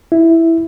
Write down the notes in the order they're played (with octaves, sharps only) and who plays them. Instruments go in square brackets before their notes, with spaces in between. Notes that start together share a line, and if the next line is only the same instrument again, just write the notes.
[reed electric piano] E4